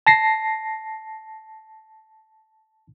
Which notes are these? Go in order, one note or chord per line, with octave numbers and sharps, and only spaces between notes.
A5 A#6 C7